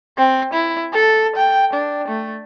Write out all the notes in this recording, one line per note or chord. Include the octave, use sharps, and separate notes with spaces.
C4
E4
A4
G5
D4
A3